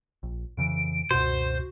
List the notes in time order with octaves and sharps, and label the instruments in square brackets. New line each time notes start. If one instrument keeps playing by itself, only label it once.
[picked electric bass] A#1
[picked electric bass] F2 C#3 E3 [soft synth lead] D7
[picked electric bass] C#2 F#2 B2 [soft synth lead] F#4 [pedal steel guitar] C5